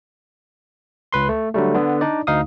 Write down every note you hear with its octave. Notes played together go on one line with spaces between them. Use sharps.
C#2 B4 C6
A3
D3 F#3 G3 A3
D3 B3
D4 D#4 D5
D2 D#4 F5 D#6